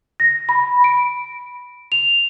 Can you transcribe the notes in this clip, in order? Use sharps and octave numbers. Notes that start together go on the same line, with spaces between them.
A#6
B5
D7
F7